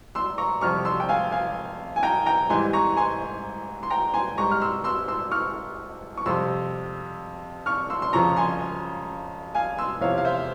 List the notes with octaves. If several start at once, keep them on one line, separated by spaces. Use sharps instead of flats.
C6 E6
A#5 C#6
F2 C3 G3 C#6 F6
C6 E6
G5
F5 G#5
F5 G#5
G#5
G5 A#5
G5 A#5
G#2 E3 G3 G#5 C6
A#5 C#6
G#5 C6
C6
G5 A#5
G#5 C6
G#2 G3 A#5 C#6
F6
C6 E6
C6 E6
C6 E6
C#6 F6
C#6
F2 C3 G3 C6 E6
C#6 F6
C6 E6
C6
F2 C#3 F3 A#5 C#6
G#5 C6
F5 G#5
C6 E6
E2 C3 F3 C#5 F5
F5
C5 E5